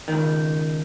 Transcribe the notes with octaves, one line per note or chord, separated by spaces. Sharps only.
C#2 D#3